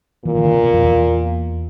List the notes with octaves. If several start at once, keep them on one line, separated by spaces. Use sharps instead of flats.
A#2 E3
D#3
D3
C3
B2
F2
E2